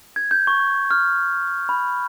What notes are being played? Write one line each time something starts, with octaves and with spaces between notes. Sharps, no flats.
G#6
G6
C#6
F6
B5